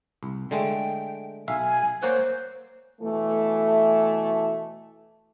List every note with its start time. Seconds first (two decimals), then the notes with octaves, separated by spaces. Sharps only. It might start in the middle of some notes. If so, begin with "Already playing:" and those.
0.23 C2
0.51 D3 G#3 A3 G5
1.48 B1 E5 F5 G#5
2.03 A#3 C5 C#5 F#5
3.02 B2 E3 A3